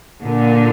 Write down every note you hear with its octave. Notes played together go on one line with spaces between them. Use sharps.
A#2 D3